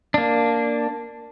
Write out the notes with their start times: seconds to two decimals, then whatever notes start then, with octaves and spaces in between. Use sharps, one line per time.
0.14 A#3 D4